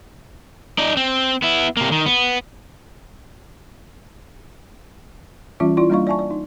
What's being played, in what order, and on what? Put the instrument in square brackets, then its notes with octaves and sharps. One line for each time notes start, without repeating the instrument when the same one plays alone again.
[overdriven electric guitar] D#4 D5
C4
B3 E4
C3 A#3
D#3
B3
[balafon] E3 G3 C#4 F4 E5 D6
E4 F4 D5 C6
G3 A#3 D4 D#5 F5 C#6
D5 E5 G#5 A5 C#6
D5
D#4